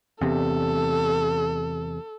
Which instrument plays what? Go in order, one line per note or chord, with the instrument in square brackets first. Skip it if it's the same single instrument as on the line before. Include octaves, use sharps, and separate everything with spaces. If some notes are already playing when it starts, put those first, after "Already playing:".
[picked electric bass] E2 C3 [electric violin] A4